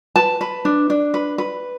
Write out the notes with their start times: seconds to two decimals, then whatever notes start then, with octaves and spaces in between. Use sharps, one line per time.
0.16 B4 A5
0.41 B4
0.65 D4
0.90 D4
1.14 B4
1.38 B4